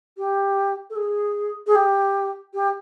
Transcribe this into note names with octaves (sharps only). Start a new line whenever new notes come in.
G4
A4
G#4
G#4
G4
G4